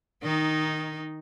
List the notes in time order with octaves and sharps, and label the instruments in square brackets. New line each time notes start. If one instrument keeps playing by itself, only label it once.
[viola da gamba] D#3 D#4